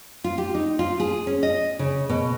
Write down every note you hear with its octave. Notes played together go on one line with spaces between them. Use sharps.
F4
G4
D#4
F4
G#4
C#4
D#5
C#3
B2